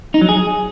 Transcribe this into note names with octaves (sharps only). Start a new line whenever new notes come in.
D#4
F#3
G#4